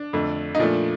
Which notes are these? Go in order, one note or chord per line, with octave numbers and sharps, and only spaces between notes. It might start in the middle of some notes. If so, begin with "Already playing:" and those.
Already playing: D4
F2 D3 A3
D#4
A#2 F3 A3 D4